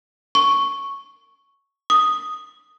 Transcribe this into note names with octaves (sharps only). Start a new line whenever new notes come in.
C#6
D#6